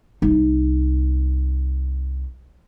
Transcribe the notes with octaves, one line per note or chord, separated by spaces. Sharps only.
C2 D#4